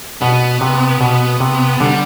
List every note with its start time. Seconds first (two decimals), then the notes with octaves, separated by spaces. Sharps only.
0.21 B2 B3
0.61 C3
1.01 B2
1.40 C3
1.80 D3 G3